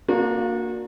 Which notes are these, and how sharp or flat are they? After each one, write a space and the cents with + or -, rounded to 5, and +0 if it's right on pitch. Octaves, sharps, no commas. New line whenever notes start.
A#3 +0 D4 +0 F#4 -30